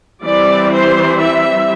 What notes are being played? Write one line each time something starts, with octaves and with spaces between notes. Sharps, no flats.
E3 G3 C4 D5
C5
E5